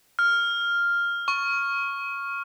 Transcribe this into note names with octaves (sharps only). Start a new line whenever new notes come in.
F6
C#6